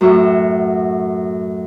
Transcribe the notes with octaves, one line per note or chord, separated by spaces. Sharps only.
F#2 A2 F#4 E5 C#6